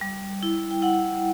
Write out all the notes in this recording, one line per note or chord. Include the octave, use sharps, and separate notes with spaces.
G3
E4
G5
E4 F#5